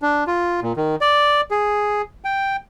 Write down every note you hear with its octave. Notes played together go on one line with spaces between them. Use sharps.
D4
F4
A#2
D#3
D5
G#4
G5